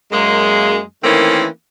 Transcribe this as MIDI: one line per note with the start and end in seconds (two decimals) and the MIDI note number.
0.12 0.80 42
0.12 0.80 56
0.12 0.80 58
1.03 1.46 51
1.03 1.46 52
1.03 1.46 57
1.03 1.46 58
1.03 1.46 60
1.03 1.46 61